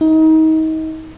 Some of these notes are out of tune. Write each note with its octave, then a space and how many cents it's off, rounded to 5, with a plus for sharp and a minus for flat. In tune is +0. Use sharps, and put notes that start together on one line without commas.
D#4 +30